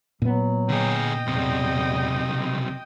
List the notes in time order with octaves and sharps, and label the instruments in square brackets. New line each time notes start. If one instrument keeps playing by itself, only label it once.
[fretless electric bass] A#2 B3 [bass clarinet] F#3
[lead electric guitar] D3 G#4 [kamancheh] D#5 G5
[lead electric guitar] B1 C3 [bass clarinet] E2